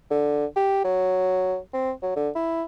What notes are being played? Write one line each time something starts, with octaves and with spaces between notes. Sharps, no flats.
D3
G4
F#3
C4
F#3
D3
E4